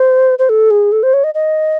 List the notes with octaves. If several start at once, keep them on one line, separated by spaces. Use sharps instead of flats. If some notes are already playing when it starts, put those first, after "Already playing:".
Already playing: C5
C5
A4
G#4
A4
C5
C#5
D#5
D#5